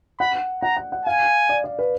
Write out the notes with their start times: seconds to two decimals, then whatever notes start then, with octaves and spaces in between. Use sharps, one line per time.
0.20 F#5 B5
0.62 F#5 A#5
0.77 F#5
0.92 F#5
1.05 F5 G#5
1.49 D5
1.64 D5
1.79 B4